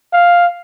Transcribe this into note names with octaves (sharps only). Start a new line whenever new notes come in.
F5